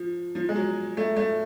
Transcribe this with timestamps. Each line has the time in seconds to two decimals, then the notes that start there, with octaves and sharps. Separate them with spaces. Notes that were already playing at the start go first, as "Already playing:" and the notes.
Already playing: F3
0.35 F3
0.49 G#3
0.56 F#3
0.97 A3
1.16 A3